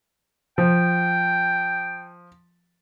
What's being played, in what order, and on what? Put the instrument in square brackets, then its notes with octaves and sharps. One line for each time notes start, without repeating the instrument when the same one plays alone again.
[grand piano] F3 [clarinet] G5